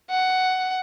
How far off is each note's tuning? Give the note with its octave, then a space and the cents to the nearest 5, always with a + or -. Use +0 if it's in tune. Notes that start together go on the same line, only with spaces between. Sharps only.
F#5 +10